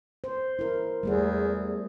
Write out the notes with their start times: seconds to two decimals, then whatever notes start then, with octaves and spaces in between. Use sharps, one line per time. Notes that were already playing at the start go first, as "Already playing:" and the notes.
0.24 C5
0.59 E4 A#4
1.03 E2 G3 A3 G#4